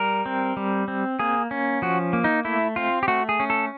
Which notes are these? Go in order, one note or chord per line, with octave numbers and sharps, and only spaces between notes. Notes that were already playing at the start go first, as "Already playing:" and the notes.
Already playing: G3 A#4
C4
G3
C4
A#3 G#4
C#4
F3 F#4
A#3
D#4
A3 E4
C4 F4
G4
A3 F#4
G#4
C#4
A4